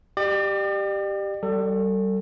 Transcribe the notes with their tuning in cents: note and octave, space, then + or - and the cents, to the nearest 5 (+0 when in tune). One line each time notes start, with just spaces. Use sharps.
G4 +0 D5 +40
G3 -25 A4 +30